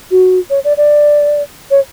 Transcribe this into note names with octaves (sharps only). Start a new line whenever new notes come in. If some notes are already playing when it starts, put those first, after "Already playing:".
F#4
C#5
D5
D5
C#5